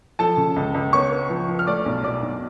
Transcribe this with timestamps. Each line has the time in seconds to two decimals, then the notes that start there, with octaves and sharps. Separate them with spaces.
0.19 F3 A4 A5
0.37 C#3
0.56 C#2
0.74 C#2
0.93 B3 C#5 C#6
1.12 B3
1.30 F3
1.48 F3
1.59 F6
1.67 A3 D5 D6
1.86 B1
2.04 B2 D5 D6
2.22 B1